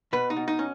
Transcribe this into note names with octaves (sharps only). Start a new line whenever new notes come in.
B2 B4
D#4
B2
D#4
C#4